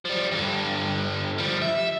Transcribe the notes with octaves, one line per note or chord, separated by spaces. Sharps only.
F3 G3
G2 D3
F3 G3
E5